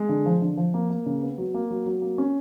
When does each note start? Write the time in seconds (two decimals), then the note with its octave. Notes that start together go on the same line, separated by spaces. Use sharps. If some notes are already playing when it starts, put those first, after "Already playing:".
Already playing: G#3
0.09 D3
0.26 F3
0.42 D3
0.57 F3
0.74 A#3
0.90 A#3
1.06 C#3
1.22 B3
1.38 F#3
1.54 A#3
1.70 F#3
1.86 F#3
2.02 A#3
2.18 C#4